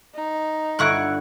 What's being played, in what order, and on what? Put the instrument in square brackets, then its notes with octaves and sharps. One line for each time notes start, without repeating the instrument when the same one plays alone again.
[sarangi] D#4
[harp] G1 F#5 [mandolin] E4 C#6 F#6